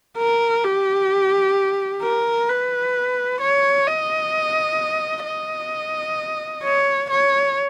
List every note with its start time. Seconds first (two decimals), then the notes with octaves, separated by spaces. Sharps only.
0.18 A#4
0.64 G4
2.03 A#4
2.49 B4
3.41 C#5
3.87 D#5
5.25 D#5
6.64 C#5
7.10 C#5